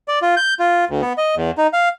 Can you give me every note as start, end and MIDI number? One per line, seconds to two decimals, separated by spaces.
0.08 0.19 74
0.22 0.35 65
0.37 0.54 91
0.59 0.85 65
0.89 1.01 38
1.02 1.13 59
1.18 1.35 75
1.36 1.51 40
1.58 1.67 63
1.73 1.89 77